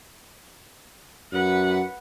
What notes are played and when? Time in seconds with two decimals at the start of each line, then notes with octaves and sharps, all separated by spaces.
1.32 F#2 B4 F#5